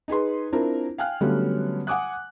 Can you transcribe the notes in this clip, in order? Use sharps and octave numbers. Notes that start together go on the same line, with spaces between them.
D#4 G#4 B4 C6
C4 D4 E4 F4 A#4
F5 G5 G#5 F6 F#6
D3 F#3 G3 A3 B3 C#4
F#5 G#5 D6 D#6 F#6